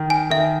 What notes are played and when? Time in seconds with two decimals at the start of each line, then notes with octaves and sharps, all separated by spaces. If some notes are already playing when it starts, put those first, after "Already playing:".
Already playing: D#3
0.10 G#5
0.30 D#3 E5